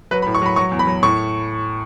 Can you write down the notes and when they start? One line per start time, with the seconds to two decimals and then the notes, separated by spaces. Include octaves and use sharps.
0.11 F#3 B4
0.22 B5
0.26 A2
0.35 C#6
0.42 F#3 B5
0.56 F#3 C#6
0.71 E2
0.79 B5
0.87 F#3
1.03 A2 C#6